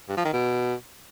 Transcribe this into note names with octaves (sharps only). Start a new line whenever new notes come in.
G2
F3
D#3
B2